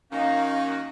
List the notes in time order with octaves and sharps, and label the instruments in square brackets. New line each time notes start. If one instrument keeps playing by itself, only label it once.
[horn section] D#3 A#3 F#4 [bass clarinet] C#4 [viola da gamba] D#4 [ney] F5